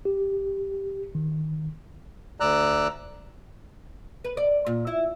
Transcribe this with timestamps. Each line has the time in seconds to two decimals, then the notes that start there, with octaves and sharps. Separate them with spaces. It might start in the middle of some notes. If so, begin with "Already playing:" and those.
0.05 G4
1.15 D#3
2.40 D2 D5 A#5 E6 F#6
4.24 B4
4.37 D5
4.66 A#2
4.87 E4